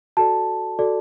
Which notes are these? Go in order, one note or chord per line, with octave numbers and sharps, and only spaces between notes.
F#4 A4 D5 A5
F#4 A4 D5